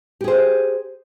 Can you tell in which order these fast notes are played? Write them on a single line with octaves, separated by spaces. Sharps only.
G4 G#4 C5